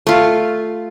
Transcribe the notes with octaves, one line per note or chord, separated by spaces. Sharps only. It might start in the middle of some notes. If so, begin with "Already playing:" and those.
A3 F4